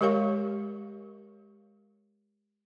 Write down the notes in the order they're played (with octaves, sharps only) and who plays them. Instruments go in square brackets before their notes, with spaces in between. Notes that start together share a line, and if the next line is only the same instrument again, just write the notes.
[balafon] G#3 G4 A#4 C#5 F5 C#6